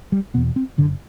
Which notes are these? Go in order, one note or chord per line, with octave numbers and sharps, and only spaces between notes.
G3
E2 B2 B3
C4
F#1 D3